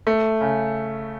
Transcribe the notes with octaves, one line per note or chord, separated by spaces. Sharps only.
A3
C#3